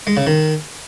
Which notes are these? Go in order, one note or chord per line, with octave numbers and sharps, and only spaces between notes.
G#3
C#3
D#3